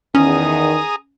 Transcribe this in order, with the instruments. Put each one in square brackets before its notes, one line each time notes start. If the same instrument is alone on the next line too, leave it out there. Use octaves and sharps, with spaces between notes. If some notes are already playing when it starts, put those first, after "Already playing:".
[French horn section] E2 D#3 [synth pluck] C#4 [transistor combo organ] G#4 A#5 D#6